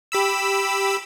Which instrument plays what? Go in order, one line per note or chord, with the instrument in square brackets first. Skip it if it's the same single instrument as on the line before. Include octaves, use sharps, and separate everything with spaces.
[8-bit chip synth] G4 B5 E6